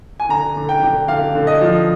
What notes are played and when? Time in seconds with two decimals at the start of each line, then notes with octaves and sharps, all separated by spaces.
0.20 G#5
0.29 D3 A#5
0.56 D3
0.69 G5
0.83 D3
1.08 D3 F5
1.35 D3
1.47 D#5
1.61 F3